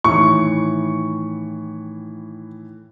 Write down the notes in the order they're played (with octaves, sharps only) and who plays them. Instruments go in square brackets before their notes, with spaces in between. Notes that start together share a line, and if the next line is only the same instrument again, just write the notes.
[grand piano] A2 D#3 E3 [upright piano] C#6